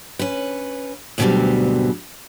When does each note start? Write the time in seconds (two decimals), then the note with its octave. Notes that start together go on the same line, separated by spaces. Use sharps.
0.19 C#4 B4
1.18 D2 G#2 B2 F#3 G3 C4